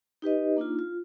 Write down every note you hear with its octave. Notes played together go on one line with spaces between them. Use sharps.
D#4 G4 B4 D#5
A#3 D4 D#4 F4
F4